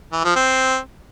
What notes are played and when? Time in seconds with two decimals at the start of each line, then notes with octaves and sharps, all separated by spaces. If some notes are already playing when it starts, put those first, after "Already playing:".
0.12 E3
0.24 F3
0.36 C4